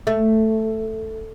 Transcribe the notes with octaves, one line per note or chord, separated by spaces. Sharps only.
A3